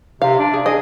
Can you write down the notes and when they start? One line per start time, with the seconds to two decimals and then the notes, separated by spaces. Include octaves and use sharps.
0.22 C3 F5
0.39 D4
0.54 G#4
0.66 G#4 D#5